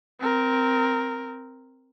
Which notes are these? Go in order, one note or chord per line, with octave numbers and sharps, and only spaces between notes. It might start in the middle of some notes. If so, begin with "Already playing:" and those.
C4 A#4